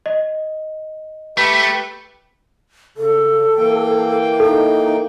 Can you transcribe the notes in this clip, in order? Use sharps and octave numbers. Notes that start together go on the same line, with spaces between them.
D#5
A3 G4 B4 B6
C#3 A4
E3 A#3 G5
D#4 A4